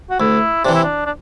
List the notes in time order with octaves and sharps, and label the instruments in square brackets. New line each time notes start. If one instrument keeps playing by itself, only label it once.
[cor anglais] F#4
[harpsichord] D2 [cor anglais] E4
[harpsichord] C3 E3 [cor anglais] D4
[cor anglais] E4
D4
D4